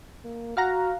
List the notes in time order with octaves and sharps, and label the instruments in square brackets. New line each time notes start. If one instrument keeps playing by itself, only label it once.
[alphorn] A#3
[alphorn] F#4 [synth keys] F5 F#5 A#5